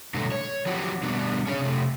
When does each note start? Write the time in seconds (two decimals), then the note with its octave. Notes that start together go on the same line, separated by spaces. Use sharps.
0.14 B2 D3 F#3 G#3 A3
0.32 C#5
0.66 F3 F#3 C4 F#4 G4
1.03 B2 G3 B3 D4 F#4
1.47 C#4 G#4 C#5
1.61 C3 A3